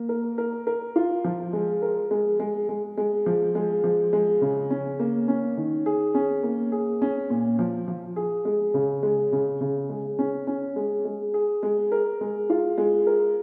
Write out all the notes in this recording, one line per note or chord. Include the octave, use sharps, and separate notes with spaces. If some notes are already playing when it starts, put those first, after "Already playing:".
Already playing: A#3
A#4
A#4
A#4
F4
F3
G#3
A#4
G#3
G#3
G#3
G#3
F3
G#3
F3
G#3
C#3
C#4
A#3
C#4
D#3
G#4
C#4
A#3
G#4
C#4
A#2
F3
F3
G#4
G#3
C#3
G#3
C#3
C#3
G#3
C#4
C#4
G#3
G#3
G#4
G#3
A#4
G#3
F4
G#3
A#4